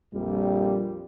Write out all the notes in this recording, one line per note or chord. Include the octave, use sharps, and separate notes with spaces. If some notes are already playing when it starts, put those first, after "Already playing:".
A#1 F2 G3